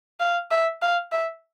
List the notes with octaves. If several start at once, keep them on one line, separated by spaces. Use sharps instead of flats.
F5
E5
F5
E5